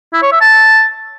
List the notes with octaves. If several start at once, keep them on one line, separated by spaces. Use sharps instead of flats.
E4
C#5
E5
A5